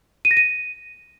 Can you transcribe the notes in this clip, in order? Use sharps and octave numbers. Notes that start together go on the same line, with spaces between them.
D#7
A#6
D#7